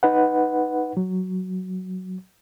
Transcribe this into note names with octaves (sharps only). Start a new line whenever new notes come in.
D#4 B4 F#5
F#3